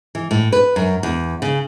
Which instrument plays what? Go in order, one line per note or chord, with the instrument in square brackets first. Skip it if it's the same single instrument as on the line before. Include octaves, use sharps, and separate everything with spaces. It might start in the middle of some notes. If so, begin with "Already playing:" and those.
[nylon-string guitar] E3
A2
B4
F#2
E2
C#3